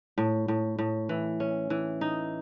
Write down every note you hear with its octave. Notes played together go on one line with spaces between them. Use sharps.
A2
A2
A2
E3
C#4
E3
D#4